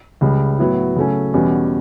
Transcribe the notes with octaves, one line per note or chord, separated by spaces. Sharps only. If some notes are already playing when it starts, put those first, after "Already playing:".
C#2 C#3 G3
A2 F#3 B3 E4
C#3 F#3 A3 C#4
E2 B2 G3 C#4